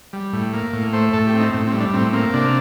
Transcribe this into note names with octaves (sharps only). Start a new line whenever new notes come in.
G3
A2
A#3
A2
A3 C5
A2 A4
G4
C4
D#4
A2 C4
C4
G3
D4
A2 C4
A#3 C4
C3 D4